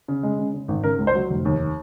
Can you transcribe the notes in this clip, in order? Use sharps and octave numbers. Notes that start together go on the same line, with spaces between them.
C#3
G#3
C#3
C#3
G#1
C#3 A#4
C#2
C5
F#3
F1
D#2